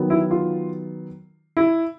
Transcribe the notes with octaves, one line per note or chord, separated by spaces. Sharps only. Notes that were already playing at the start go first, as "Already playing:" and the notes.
Already playing: D#3 F#3 B3
E4
F4
E4